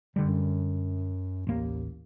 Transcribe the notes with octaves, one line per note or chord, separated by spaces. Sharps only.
F#2 D3 G3
A1 D#2 A#3